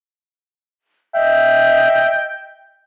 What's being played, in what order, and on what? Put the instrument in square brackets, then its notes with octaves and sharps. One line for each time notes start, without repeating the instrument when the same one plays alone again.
[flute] D#5 [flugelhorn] E5 [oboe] G5